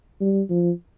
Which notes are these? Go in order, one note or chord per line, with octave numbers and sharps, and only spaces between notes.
G3
F3